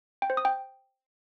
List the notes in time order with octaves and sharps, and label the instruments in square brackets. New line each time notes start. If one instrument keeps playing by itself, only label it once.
[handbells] G5
C5
D#6
G5